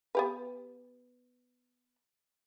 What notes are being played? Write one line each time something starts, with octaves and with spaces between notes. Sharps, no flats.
B3 G4 B4